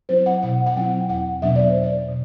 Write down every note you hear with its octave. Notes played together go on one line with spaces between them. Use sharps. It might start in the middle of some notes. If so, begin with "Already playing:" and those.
F#3 C4 E4 C5
F#5
B2 F#5
F#5
F#3 C4 E4 G5
E2 F#5
B2 F#3 B3 D4 E5
D5
C5
E2
D5
B2